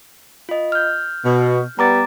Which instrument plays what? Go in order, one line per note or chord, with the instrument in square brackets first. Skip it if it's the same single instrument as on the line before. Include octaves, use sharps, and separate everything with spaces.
[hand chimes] F4 D#5
F6 G6
[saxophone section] B2
[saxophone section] G3 B3 [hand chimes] A#5 D6 A6